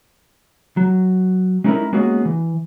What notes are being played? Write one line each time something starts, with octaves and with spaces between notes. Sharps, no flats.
F#3
G#3 C#4 D#4 E4 A4 A#4
G#3 A#3 B3 C#4 F#4 G#4
E3